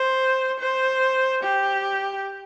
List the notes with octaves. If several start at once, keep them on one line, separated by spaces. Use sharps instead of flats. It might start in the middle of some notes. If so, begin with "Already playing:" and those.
Already playing: C5
C5
G4